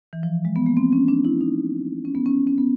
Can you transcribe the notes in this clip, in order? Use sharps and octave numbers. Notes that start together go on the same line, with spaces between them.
E3
F3
G#3
B3
A#3
C4
C#4
D4
E4
D#4
C#4
B3
C#4
C#4
B3